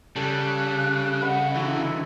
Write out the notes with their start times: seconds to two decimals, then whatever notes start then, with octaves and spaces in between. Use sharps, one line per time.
0.16 C#3 G3 A4 F#6
1.22 B4 D#5 F#5
1.55 D3 E3 D#4 E4 F#4